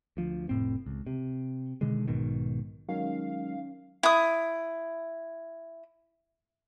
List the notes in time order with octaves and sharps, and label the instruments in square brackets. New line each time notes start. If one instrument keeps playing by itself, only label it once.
[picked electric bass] D2 F3
F1 A2 C4
C#2
C3
B2 D3 D#3 G#3
B1 G#2 B2 D#3
[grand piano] D#3 [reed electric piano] F#3 G#3 [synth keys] C#4 [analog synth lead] F5
[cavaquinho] E4 D#6